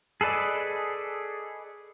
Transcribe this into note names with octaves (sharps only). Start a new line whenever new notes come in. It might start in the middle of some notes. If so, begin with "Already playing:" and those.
G#4 A4 B4 D5 D#5